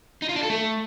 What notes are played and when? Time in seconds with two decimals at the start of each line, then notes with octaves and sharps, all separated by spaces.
0.22 D#4
0.29 F4
0.36 D4
0.43 A4
0.50 A3